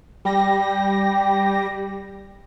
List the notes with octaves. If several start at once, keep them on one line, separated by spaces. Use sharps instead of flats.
G3 G4 A#6